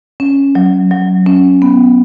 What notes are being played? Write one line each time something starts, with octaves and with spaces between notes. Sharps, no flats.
C#4
F#3
F#3
C#4
B3